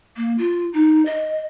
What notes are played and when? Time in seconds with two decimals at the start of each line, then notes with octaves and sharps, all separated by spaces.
0.16 A#3
0.38 F4
0.73 D#4
1.05 D#5